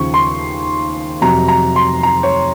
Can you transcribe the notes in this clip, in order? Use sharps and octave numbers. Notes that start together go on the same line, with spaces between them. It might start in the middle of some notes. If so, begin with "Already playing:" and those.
Already playing: D#2 C#3 F3 C#6
C6
F2 C3 F#3 A#5
A#5
C6
A#5
C#5